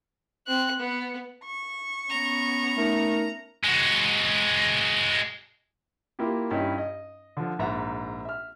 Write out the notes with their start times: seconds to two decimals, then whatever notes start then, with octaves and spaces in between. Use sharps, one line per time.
0.47 C4 F#6
0.80 B3
1.46 C#6
2.10 B3 C#4 A#5
2.77 A3 D#4 A#4
3.64 G#3 F#4
6.19 A#3 E4 F4 G4
6.51 G2 C#4 D#4 E4
6.78 D#5
7.37 D3 F3
7.59 A#1 G#2 E5 F#5 A#5
8.25 E5 F6